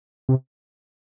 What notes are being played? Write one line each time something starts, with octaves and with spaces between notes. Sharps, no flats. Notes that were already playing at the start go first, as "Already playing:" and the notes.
C3